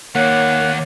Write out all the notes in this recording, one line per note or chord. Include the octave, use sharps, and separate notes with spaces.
D#2 A#3 C#5 F#5